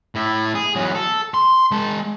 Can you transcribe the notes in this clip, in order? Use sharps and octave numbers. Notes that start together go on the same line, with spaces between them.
A2 E4
G#4
E2 F#3
A4
C6
G#3 A5